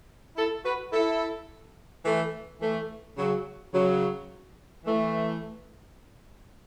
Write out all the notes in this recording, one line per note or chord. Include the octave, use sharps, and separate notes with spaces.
E4 A4
F#4 B4
E4 A4
E3 A3
E3 A3
C#3 F#3
C#3 F#3
E3 A3